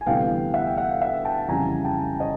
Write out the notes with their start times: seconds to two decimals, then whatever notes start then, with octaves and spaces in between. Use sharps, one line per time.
0.01 G#5
0.06 D2 C3 E3 G3 B3 F5 G5
0.54 E5 F#5
0.67 G5
0.77 E5 F#5
0.90 F5
1.01 E5 F#5
1.25 G5 A5
1.48 F2 C#3 E3 G3 G#5 A#5
1.84 G5 A5
2.20 C#5 D#5